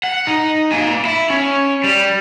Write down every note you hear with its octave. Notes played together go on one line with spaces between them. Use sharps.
F#5
D#4
A#3 G#5
E4
C#4
G3